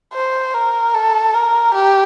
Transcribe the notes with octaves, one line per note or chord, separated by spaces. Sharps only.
C5
A#4
A4
A#4
G4